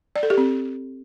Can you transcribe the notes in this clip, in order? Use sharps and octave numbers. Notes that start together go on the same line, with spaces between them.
D5
A4
G4
C4